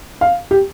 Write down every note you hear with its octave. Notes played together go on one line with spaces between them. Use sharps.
F5
G4